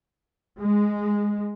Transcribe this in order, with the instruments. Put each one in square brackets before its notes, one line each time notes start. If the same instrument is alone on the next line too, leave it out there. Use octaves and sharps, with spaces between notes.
[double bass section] G#3